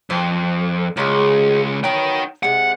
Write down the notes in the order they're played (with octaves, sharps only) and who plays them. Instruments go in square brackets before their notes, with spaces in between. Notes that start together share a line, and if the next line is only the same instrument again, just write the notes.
[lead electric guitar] F2 [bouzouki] C5
[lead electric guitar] C#2 [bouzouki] F#3 G#3 G#4
[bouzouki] F#3 B3 [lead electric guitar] D#4 G5
[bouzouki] C3 G#3 [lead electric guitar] F#5